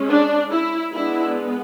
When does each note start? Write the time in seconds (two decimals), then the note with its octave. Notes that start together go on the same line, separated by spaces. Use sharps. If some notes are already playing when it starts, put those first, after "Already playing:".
Already playing: G#3 C#4
0.08 D4
0.51 E4
0.93 G#3 B3 D4 E4